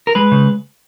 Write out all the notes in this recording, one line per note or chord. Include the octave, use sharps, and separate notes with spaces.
A#4
G#3 B4
C#3